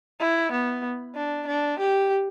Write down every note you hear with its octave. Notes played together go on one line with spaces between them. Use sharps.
E4
B3
D4
D4
G4